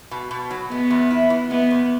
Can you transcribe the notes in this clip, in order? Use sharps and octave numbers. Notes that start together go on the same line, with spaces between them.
B2
B2
F#3
G#3 B3
E2
E4
E3
G#3 B3
E2